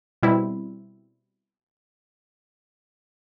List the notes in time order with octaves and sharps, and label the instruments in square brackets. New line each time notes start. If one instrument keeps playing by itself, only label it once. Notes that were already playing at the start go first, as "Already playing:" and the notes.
[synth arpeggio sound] B2 G3 C4 E4